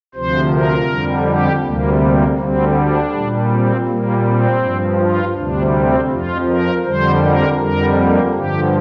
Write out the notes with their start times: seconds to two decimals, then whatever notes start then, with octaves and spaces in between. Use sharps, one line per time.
0.14 D2 C3 F3 C5
0.52 A#4
0.89 F2 D3 G3
1.26 G4
1.64 D2 C3 G3 A#3
2.01 A#3
2.38 D2 D3 G3 C4
2.76 D4
3.12 A#2 G3
3.51 C4
3.87 A#2 G3 A#3
4.25 C4
4.61 G2 F3
4.98 F4
5.36 D2 C3 G3 D4
5.74 C4
6.10 F2 F3 F4
6.48 A#4
6.84 F2 D3 G3 C5
7.23 A#4
7.59 F2 D3 G3 A#4
7.96 A#3
8.34 G2 D3 F3 G4